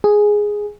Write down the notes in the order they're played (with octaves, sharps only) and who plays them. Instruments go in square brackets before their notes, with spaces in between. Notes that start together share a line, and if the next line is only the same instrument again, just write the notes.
[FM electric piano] G#4